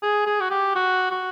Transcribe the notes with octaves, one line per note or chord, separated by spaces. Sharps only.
G#4
G#4
F#4
G4
F#4
F#4